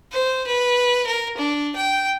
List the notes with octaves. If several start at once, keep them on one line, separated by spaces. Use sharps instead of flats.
C5
B4
A#4
D4
G5